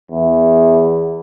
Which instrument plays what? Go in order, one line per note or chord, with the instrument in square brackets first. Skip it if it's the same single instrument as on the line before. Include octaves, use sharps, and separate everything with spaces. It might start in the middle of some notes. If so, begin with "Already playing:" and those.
[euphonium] E2